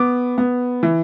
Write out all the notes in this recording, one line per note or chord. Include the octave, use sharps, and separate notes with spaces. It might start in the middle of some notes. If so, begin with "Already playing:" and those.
Already playing: B3 D6
B3
E3